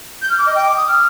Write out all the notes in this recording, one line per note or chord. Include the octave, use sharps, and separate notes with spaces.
G6
F6
D6
D#5
G5
D6
D#6
F6